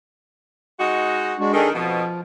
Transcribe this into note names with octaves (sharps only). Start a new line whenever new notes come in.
G#3 D#4 F#4
G#3 D4 F#4
D#3 D4 G#4 A4
F2 B2 F3